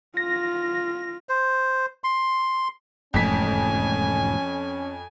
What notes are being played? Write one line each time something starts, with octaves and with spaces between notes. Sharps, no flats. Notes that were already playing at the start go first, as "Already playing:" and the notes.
F4 A#6
C5
C6
E1 F2 G#2 A3 C#4 G#5 B6